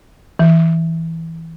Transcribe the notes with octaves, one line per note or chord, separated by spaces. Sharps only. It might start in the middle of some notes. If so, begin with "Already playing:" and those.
E3